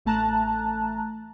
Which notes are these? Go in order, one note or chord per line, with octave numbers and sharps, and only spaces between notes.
A1 A3 A5 A#5 F#6